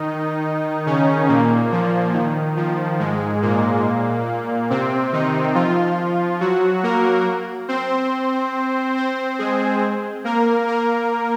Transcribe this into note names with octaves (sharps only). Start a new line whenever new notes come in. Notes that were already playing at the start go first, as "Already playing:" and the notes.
Already playing: D#3 D#4
C#3 C#4
A#2 A#3
F3
D#3
F3
G#2 G#3
A#2 A#3
C3 C4
D#3 D#4
F3 F4
F#3 F#4
A#3 A#4
C4 C5
C4 C5
G#3 G#4
A#3 A#4
A#3 A#4